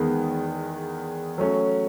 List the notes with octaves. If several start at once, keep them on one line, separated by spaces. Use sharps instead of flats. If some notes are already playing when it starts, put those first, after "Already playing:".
Already playing: E2 D#3 G#3 B3
F#3 A3 C#4